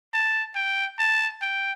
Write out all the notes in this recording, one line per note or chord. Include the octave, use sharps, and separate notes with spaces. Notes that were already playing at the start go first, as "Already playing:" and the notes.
A5
G5
A5
G5